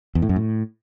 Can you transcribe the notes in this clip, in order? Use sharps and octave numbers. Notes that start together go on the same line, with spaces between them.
E2
A2
F#2
A2